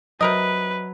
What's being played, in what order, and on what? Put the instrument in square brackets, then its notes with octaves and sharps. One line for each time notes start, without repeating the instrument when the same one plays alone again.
[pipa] C3 A#4 D#5 [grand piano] F#3 [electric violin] B4